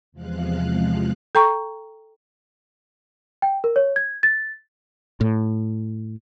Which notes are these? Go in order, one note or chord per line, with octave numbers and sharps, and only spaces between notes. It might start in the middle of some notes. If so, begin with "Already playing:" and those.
E2 C3 F3 G#3 F5 F#6
A4 G5 A#5 C#6
G5
A#4
C#5
G#6
A6
A2